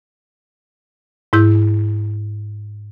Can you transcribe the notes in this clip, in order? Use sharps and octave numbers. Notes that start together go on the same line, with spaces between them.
G#2 E4 G6